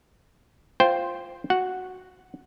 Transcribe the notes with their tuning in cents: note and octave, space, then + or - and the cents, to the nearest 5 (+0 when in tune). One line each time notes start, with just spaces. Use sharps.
F4 +0 C5 +0 G5 +0
F#4 +0 F#5 -5